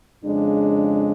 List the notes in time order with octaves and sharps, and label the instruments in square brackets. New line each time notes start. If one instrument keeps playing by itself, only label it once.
[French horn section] F2 C#3 G#3 D4